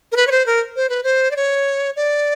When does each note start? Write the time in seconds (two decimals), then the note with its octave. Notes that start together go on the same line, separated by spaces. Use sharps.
0.12 A#4
0.16 B4
0.27 C#5
0.31 C5
0.46 A#4
0.76 C5
0.89 B4
1.04 C5
1.31 D5
1.36 C#5
1.96 D5